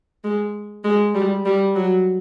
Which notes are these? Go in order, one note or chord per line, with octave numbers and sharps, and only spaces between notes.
G#3
G#3
G3
G3
F#3